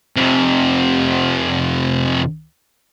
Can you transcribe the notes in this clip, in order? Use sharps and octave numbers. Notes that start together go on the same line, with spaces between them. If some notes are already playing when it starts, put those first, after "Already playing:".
F2 C3